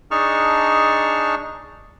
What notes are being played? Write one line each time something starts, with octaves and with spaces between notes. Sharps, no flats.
D4 D#4 G#4 A5 C#6 F6